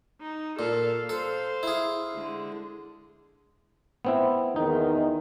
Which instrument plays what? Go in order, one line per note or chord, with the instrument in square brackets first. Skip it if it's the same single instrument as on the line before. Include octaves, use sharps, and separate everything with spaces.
[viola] D#4
[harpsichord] A#2 [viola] A4 F5
[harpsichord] A4 [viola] C5 F5
[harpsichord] E4 G#4
[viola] D3 G#3
[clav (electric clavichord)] B3 C4 E4
[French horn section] E2 D#3 [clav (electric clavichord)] D#4